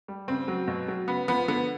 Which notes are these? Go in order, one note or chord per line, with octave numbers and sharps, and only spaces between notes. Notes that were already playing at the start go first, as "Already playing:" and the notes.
G3
C#3 C4
F#3
B2
F#3
C#3 B3
F3 B3
D3 B3